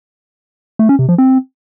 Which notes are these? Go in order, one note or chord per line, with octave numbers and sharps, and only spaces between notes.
A3
C#4
C3
F3
C4